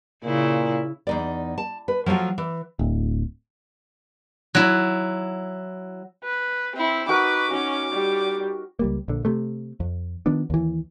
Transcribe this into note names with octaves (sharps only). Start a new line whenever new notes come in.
A#2 C#3 E4
E2 D#4 D5
A5
B4
F3 F#3 A3 F4 F#4
E3
D1
F#3 E4
B4
C4 E4
D#4 F#4 A#4 B4 D6
C#4 D#4 F#4
G3
C#2 G3 A#3
A#1 D3
C3 A3
F2
D#3 F3 B3 D4
D#2 E3